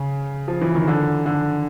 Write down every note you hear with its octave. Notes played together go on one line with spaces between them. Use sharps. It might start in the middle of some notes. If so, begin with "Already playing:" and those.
Already playing: C#3
F3
E3
D#3
D3
D3